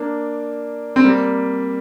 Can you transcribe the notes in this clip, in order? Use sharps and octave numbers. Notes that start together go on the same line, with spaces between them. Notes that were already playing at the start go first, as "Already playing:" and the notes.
Already playing: A#3 D4
C4
G3 A#3